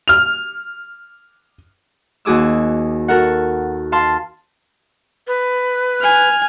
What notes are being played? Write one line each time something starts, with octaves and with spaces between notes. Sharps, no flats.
F6 F7
D#2 F#4 G#4 D6 E6
F#4 A4 A#4 F#5
F5 A5 C6
B4
G#5 F6